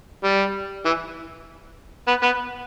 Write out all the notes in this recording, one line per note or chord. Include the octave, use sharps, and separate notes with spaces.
G3
E3
B3
B3